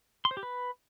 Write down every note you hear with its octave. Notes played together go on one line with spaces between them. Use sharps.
C6
C5
G4
B4